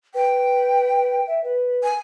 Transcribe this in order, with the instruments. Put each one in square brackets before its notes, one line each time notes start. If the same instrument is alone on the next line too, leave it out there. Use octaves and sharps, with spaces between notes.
[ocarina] B4 [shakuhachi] G5
[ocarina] E5
B4
[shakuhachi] G#5